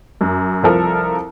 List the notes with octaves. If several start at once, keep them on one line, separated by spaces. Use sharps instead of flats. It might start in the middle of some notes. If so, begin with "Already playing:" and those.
F#2
C2 F3 A4 A#4